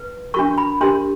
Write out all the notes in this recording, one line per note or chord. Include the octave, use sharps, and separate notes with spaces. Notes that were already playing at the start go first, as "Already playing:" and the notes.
Already playing: B4
D4 F#4 A#4 C#6
B5
D4 G4 A#4 C6